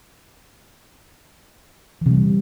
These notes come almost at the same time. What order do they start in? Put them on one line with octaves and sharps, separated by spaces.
E3 C3 G3